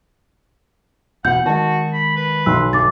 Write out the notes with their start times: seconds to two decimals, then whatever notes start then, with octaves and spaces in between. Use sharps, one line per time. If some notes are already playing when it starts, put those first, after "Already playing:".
1.25 E1 B2 B3 F#5 G6
1.46 D#3 G#3 F#4 A5
1.93 B5
2.16 B4
2.46 B1 C6 E6 F#6
2.73 G1 D6 A6